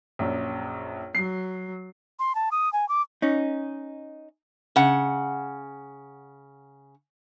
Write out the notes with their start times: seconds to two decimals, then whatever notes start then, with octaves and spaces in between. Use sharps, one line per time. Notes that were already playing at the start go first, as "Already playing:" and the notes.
0.19 A#1 F#2
1.15 F#3 C7
2.19 C6
2.35 A5
2.52 D#6
2.73 G#5
2.89 D6
3.22 C#4 D#4
4.76 C#3 F#5